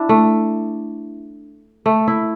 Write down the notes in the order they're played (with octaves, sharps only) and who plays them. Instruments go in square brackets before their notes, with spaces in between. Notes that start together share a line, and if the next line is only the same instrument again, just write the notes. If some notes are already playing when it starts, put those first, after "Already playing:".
Already playing: [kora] D4 E4
A3
A3
E4